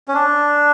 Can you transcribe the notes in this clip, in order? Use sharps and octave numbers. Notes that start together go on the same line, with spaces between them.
C#4
D4